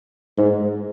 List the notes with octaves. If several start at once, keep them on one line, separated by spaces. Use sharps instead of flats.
G#2